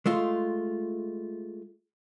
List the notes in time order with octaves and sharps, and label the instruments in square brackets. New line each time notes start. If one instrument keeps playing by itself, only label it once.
[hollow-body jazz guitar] G#3 A3 F4